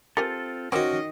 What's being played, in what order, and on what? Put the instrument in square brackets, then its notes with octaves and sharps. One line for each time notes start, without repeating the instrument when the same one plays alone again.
[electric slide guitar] C4 F4 A4 [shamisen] G4 A#4 G#5
[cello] D#3 D#5 [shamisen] A#3 C4 G#5 [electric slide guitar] C#4 [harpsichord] F#4 D6